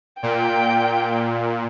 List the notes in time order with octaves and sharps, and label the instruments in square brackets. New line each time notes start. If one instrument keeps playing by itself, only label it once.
[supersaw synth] A#2 [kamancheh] G5